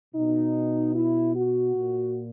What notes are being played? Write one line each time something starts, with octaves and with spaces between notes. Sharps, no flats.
B2 D#4
E4
F#4
A#2